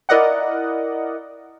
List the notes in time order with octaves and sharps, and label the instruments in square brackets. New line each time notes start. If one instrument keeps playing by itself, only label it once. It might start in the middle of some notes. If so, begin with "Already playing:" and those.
[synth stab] E4 A#4 D5 D#5 F#5